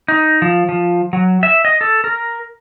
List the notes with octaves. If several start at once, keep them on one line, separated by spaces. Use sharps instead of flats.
D#4
F3
F3
F#3
E5
D#5
A4
A#4